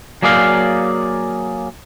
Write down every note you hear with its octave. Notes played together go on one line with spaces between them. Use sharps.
F#3 A#3 G#4 D5 F5